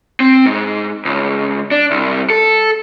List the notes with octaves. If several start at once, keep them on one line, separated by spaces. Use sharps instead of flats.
C4
G#2
C#2
D4
C2
A4